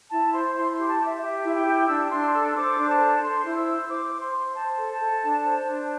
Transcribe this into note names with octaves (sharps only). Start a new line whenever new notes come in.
E4 A5
C5 C6
E4 C6
C6
G4
A5
G4
E5
G4 E5
E4
G5
G4
D4 E6
D4 C6
A4 E6
C5 D6
D4
A5
A4
C5 C6
E4
E6
C5
C5 D6
C5
C6
C5
C5 A5
A4
A5
A4
D4
C5
D4